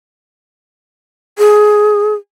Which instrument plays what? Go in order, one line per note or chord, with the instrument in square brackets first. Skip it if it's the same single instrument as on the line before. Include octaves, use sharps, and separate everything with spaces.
[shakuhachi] G#4